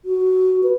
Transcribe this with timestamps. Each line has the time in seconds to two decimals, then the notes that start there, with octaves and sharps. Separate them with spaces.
0.05 F#4
0.63 B4